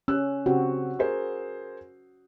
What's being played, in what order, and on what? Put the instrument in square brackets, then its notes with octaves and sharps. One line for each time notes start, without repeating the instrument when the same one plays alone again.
[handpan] C#4 [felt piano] E6 F#6
[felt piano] C#3 C4 G4 [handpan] F#4
[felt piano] G#4 A#4 C5